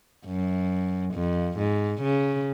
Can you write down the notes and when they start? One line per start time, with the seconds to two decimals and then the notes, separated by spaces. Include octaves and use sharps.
0.26 F#2
1.14 F2
1.58 G#2
2.02 C#3